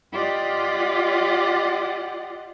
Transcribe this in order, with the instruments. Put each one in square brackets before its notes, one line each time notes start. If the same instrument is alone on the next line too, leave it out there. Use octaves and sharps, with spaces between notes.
[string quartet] F4 G4 D5 D#5 F#5